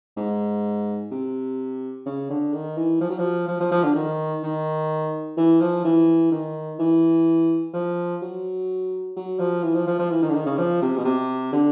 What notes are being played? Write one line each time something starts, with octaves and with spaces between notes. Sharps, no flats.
G#2
C3
C#3
D3
D#3
E3
F3
F#3
F3
F3
F3
F3
D3
D#3
D#3
E3
F3
E3
D#3
E3
F3
F#3
F#3
F3
E3
F3
F3
F3
E3
D#3
D3
D#3
C#3
F3
C3
B2
C3
D3